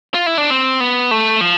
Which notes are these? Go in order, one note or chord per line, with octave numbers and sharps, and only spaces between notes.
F4
E4
D4
C4
B3
A3
F3